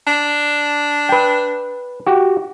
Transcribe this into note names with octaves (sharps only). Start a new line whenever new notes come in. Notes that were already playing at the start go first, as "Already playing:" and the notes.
D4
B4 G5
F#4 G4